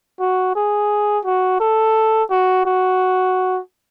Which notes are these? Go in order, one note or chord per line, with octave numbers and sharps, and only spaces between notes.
F#4
G#4
F#4
A4
F#4
F#4